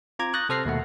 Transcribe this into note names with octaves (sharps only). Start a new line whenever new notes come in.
C4 F4 A#5 D6 G#6
C#6 D#6 F#6 G6 A6 A#6
C3 A4 C5 F6 A#6 C7
D#2 B2 A3 F#5